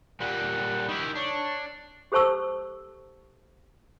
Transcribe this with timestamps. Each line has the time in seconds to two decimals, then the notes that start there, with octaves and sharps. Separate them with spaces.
0.20 A#2 G3 F#5
0.89 D#3 E4 G4
1.15 D4 C#5
2.12 G4 A4 C5 A5 C#6 E6